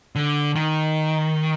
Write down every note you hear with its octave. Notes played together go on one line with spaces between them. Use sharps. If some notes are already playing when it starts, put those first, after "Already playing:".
D3
D#3